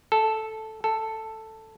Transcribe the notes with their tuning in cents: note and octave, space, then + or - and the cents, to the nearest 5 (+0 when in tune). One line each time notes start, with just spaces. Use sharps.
A4 -5
A4 +5